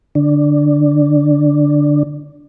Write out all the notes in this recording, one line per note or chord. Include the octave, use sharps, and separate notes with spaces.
D3 D4